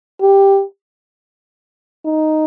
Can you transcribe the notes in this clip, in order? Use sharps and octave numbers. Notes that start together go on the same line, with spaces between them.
G4
D#4